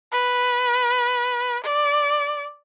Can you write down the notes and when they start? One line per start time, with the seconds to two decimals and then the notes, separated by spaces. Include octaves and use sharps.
0.12 B4
1.64 D5